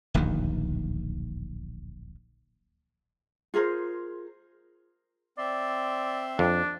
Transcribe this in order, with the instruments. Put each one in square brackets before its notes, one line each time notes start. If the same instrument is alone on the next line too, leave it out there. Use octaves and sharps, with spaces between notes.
[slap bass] D1 A#1 D#2 D#3
[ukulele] F4 G#4 A#4 C5
[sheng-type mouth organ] C4 E5 C6 [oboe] D5
[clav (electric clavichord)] F2 [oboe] D4